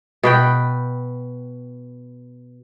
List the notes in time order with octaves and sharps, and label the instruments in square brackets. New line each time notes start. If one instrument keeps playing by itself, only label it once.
[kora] B2 B4 G5